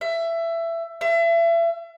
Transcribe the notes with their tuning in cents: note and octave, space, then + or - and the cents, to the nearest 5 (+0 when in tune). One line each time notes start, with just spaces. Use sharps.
E5 +20
E5 +35